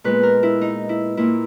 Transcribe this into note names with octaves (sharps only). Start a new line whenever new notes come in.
A#2 G#3 B3 B4
A#4
E4
D#4
E4
A#2 A#3 E4